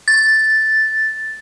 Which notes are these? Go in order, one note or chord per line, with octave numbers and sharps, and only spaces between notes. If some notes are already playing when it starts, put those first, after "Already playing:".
A6